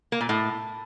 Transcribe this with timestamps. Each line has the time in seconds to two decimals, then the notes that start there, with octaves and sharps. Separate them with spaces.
0.12 A#3
0.21 A#2
0.29 A2